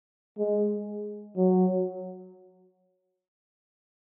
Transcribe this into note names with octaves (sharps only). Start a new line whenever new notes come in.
G#3
F#3